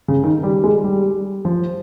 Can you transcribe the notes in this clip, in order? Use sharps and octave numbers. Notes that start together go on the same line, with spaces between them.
C#3
D#3
G3
G#3
G3
F3